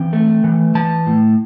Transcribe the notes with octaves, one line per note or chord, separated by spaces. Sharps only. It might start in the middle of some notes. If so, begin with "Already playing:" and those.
Already playing: E3 C4 G5
A3
E3
E3 A5
A2